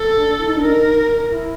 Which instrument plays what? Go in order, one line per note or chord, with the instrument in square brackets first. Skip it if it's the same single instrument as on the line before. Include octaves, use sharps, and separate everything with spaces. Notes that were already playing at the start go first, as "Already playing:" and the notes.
Already playing: [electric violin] A4
[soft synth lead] D4
E4
D#4
D4
[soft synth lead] D#4 [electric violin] A#4
[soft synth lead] E4